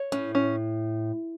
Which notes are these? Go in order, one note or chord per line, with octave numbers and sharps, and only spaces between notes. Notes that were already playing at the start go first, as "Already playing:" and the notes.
Already playing: C#5
A2 C#4
C#4